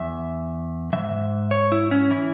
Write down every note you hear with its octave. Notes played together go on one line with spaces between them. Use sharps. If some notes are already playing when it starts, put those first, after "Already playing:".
Already playing: E2 E5
G#2 E3 E5
C#5
E4
C#4
E3 E4